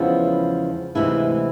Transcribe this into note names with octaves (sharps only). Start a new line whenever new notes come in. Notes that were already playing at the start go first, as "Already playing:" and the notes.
Already playing: E2 C#3 F3 G#3 B3 E4
D2 C3 E3 G#3 E4